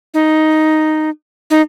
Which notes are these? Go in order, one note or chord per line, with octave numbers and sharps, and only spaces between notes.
D#4
D#4